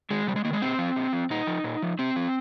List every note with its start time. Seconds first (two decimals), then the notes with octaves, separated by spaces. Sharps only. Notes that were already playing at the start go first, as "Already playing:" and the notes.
0.11 D#3 G#3
0.27 C3 G3
0.36 G#3
0.45 D#3 A#3
0.53 G#3
0.62 A#2 C4
0.79 F3
0.96 A#2
1.13 F3
1.30 A#2 D#4
1.47 F3
1.64 A#2
1.82 F3
1.99 C3 C4
2.16 F3